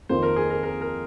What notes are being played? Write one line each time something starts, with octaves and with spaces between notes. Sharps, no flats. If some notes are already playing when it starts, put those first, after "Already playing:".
F2 D#3 A#3 F4 C5
A#4
G#4
A#4
A#4
A#4